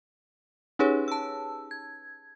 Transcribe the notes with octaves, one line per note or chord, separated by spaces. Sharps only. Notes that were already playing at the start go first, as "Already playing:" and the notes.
C#4 D#4 G4 G#4 B4 C#5
A5 E6
G#6